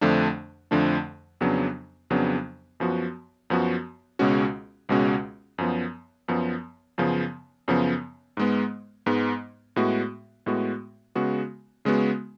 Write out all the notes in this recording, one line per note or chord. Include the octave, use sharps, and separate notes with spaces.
F2 D3 F3 A3 D4
F2 D3 F3 A3 D4
F2 C#3 F#3 B3 D4
F2 C#3 F#3 B3 D4
F#2 F3 B3 F#4
F#2 F3 B3 F#4
C#2 B2 G#3 C#4 F#4
C#2 B2 G#3 C#4 F#4
F#2 F3 B3
F#2 F3 B3
F#2 C#3 F3 B3
F#2 C#3 F3 B3
G#2 G#3 B3
G#2 G#3 B3
A2 G#3 B3 F#4
A2 G#3 B3 F#4
C#3 G#3 B3 F#4
C#3 G#3 B3 F#4